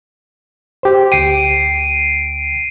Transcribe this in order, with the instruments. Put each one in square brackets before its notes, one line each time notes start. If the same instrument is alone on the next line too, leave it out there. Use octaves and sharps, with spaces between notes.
[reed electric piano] G4 C5
[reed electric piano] D2 G5 [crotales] C7 D7 D#7